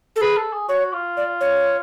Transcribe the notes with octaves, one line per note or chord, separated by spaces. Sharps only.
A4
G#4 B4
A4
G#4
F#4 C#5
F4
D5
C#5